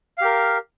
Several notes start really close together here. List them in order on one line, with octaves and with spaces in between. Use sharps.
F5 G4 A#4